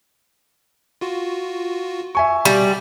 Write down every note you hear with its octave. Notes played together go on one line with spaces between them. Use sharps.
F4 F#4
E5 G#5 C#6
B2 G3